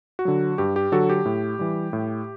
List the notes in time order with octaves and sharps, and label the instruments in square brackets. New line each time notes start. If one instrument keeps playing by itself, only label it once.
[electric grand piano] F#4
D3 F#3
G2 G4
G4
D3 F#3 F#4 A4
G4
A2
E3 G3
A2